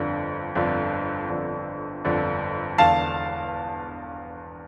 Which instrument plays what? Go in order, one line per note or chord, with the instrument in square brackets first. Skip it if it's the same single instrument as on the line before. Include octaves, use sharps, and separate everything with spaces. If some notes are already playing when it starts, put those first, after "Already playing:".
Already playing: [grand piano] G1 F2 D3
G1 F2 D3
G1 F2 D3
G1 F2 D3
E1 E2 D3 F5 A5